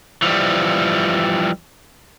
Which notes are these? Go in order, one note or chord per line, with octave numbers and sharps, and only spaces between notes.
E3 F3 G3